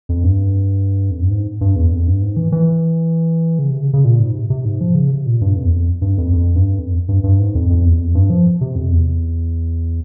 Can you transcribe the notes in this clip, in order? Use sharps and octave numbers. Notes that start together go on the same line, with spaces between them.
F2
G2
F2
G2
G#2
G2
E2
F2
G2
G#2
E3
E3
C#3
C3
C#3
C#3
A#2
G#2
C3
C3
G#2
F3
C#3
C3
A#2
G2
F2
E2
F2
G2
F2
F2
G2
F2
G2
G2
G#2
F2
F2
E2
F2
G2
F3
C3
F2
E2